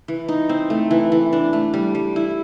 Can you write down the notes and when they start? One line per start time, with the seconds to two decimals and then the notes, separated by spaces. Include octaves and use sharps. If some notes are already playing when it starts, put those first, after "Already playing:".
0.08 E3
0.28 D#4
0.49 C4
0.70 A3
0.91 E3
1.12 E3
1.33 D4
1.53 A3
1.73 G3
1.95 G3
2.16 E4